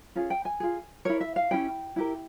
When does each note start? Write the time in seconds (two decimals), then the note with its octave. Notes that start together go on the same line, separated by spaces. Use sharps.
0.15 C#4 F4 G#4
0.30 G5
0.45 G#5
0.60 F4 G#4
1.05 E4 A#4 C#5
1.21 E5
1.36 F5
1.51 C#4 E4 G4 G5
1.96 E4 G4 A#4